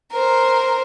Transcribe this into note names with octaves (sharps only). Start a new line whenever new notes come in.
A#4 C5